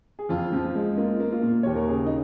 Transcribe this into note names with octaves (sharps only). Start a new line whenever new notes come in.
G#4
F2 F4
F3
G#3
A#3 F4
A#3
F4
A#2
D#2 C#5
A#4
C#3 G#4
D#4